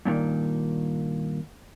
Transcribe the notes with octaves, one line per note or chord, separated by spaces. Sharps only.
G2 A#2 D3 D#3